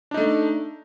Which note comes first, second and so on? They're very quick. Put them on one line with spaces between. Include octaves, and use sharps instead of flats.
D4 D#4 A3